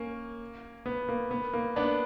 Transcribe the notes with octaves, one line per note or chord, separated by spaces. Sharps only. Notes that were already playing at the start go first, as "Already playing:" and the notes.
Already playing: A#3 C#4
B3
A#3
B3
A#3
B3 D4